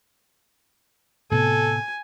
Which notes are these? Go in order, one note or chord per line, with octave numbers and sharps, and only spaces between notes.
A2 C3 B3 A4 G#5